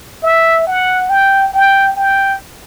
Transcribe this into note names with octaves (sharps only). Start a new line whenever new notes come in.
E5
F#5
G5
G5
G5